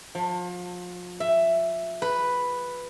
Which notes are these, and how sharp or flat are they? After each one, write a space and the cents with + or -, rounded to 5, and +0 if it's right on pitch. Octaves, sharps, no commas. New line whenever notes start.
F3 +35
E5 +10
B4 +0